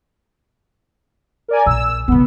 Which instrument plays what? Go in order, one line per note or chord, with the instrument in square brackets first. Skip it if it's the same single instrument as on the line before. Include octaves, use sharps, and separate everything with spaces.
[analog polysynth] A#4 D5 G#5
[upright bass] A#1 [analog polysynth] E6
[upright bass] C#3 F3 [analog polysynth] B3